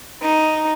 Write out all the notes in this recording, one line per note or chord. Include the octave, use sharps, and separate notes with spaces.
D#4